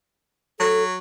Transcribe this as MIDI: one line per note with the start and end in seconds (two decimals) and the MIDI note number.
0.60 0.98 54
0.60 0.83 69